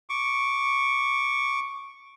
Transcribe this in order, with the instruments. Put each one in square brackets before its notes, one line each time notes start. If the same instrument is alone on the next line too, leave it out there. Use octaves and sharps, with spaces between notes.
[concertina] C#6 D6